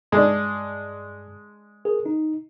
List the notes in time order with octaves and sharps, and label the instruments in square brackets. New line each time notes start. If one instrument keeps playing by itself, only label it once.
[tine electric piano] G2 [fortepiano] G#3 D4
[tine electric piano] G#4 A#4
D#4